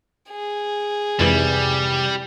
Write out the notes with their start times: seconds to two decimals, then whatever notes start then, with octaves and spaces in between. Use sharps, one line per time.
0.29 G#4
1.19 F2 G#2 C3 E3 G3